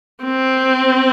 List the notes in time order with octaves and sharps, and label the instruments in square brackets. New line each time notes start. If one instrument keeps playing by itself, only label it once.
[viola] C4